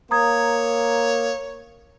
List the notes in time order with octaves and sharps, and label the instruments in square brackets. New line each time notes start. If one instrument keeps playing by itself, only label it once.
[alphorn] A#3 [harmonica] C#5 [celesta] A#5 D#6 G#6